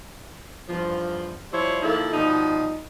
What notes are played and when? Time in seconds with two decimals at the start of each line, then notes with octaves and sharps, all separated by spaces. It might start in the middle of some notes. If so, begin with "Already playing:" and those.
0.69 E2 G2 F3
1.52 F3 G3 E4 C5 C#5
1.83 D#3 F3 A#3 E4 A4
2.13 B2 F3 G3 D#4